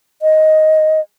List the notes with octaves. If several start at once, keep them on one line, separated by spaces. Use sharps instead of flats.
D#5